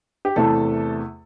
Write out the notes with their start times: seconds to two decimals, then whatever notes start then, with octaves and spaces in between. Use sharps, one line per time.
0.25 G4
0.36 E2 C3 E3 A3 A4